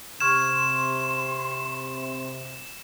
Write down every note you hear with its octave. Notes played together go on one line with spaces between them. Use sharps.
C3 C6 C#6 F6 G#6 E7